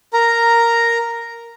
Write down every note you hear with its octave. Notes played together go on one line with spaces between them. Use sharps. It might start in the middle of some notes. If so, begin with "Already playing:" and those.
A#4 A#5